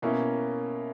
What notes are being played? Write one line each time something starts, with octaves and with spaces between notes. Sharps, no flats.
B2 A#3 C#4 E4